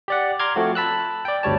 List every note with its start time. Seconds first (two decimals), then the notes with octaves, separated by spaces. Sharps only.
0.08 G4 D5 F#5
0.39 A#5 C6 D6 F6 G#6
0.56 F3 A3 C4 F#4
0.75 A5 B5 E6 F#6
1.25 D5 G5
1.43 G1 D2 G3 C#5 A5